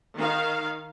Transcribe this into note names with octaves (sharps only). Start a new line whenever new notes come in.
D#3 F5